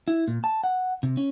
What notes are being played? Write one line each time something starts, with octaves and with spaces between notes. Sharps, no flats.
E4
A#2
A5
F#5
C3
C#4